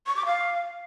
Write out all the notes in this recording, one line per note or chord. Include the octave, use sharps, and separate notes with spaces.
C#6
D6
F5